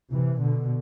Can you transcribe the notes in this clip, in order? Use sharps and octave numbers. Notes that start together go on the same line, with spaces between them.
C3 E3
B2 D3